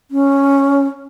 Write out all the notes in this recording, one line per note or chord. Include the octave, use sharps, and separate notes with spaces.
C#4